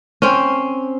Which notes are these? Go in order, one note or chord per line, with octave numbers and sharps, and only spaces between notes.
C4 C#4